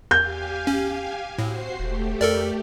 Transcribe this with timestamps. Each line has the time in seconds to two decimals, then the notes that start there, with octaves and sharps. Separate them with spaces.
0.11 E2 G4 F5 G#5 G6
0.67 C#4
1.39 A2 C4 F#4 C5 C7
1.79 E1 A3 G4
2.21 F2 A4 A#4 D5